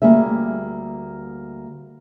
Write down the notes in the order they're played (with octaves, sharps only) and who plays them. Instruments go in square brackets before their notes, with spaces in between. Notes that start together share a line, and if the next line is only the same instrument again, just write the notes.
[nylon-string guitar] D2 G3 A#3 G#4 E5